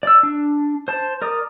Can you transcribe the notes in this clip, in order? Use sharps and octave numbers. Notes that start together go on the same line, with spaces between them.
D5 E6
D4
C5 A5
A#4 D5 D#6